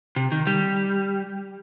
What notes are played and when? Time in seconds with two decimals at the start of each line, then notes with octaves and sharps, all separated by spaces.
0.16 C3
0.32 D#3
0.47 G3